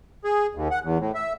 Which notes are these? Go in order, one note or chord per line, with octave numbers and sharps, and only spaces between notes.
G#4
D#2
F#5
E2
A2
E5